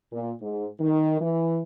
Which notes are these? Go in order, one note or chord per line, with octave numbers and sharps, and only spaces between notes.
A#2
G#2
D#3
E3